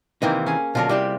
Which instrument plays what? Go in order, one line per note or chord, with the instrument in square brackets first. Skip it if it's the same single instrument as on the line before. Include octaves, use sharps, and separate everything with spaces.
[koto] C3 A#3 C4 [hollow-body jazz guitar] D#3 E3 D#4
[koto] C#4 G#4
[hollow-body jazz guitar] B2 D3 F#3 [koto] F4 A#4
[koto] C3 [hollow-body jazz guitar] G3 E4 G4